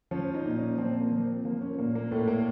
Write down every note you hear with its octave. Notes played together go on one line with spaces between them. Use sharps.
F3 C#4
D#4
A#2
C#4
F3 C4
A#3
F3
C4
F3 A#3
C#4
A#2 A#3
A#3
A2 A3
A#3